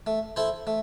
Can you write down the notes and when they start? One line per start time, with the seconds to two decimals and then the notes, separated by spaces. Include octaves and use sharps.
0.06 A3
0.36 E4 A4 C5
0.67 A3